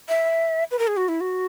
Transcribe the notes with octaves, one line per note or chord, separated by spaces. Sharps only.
E5
B4
A#4
G#4
F#4
E4
F#4